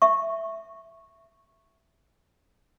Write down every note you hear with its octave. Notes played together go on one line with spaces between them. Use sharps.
E5 C#6